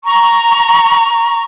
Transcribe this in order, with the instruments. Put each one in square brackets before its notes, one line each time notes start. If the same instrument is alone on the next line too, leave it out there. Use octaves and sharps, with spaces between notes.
[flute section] A#5 C#6